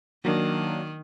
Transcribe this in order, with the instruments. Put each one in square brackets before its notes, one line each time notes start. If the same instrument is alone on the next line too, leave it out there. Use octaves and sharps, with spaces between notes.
[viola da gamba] D#3 [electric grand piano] F#3 A#3 D4